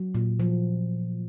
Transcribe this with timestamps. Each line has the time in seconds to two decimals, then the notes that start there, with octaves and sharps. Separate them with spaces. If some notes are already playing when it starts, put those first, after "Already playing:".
Already playing: F#3
0.15 A#2
0.40 F3